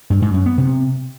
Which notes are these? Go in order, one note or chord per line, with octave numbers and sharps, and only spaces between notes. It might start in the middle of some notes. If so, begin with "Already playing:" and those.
G2
G#2
F#2
B3
C3